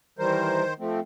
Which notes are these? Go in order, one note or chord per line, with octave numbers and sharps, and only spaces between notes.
D#3 E3 G3 A#4 C5
F3 A3 C4